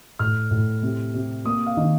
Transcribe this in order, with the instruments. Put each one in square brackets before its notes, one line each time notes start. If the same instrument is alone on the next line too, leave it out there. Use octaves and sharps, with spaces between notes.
[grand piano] A2 F6
A2
C3
C3
A#3 D#6
F5
D#3